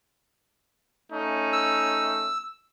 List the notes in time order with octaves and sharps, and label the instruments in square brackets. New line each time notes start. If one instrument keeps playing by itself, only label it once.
[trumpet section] A3 C#4 D#4
[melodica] E6